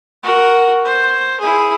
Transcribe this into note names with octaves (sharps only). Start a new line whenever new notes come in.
F#4 A#4
C5
E4 G#4